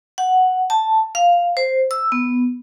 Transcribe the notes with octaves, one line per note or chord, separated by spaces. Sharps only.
F#5
A5
F5
C5
E6
B3